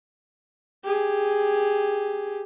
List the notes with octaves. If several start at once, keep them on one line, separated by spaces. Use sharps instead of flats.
G4 G#4